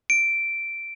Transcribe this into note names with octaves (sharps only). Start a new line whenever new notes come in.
D7